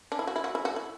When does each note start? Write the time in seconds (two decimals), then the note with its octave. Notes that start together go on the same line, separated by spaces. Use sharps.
0.12 D4
0.19 E4
0.27 F#4
0.36 E4
0.44 F#4
0.55 E4
0.65 F#4
0.76 E4